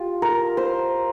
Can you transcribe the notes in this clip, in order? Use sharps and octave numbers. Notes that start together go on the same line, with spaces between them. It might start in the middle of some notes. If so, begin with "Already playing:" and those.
Already playing: F4 G4
A#4
C5